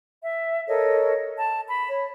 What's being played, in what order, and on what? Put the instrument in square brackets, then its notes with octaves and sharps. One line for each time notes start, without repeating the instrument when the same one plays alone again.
[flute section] E5
A4 A#4 C#5 D#5
A5
B5
C#5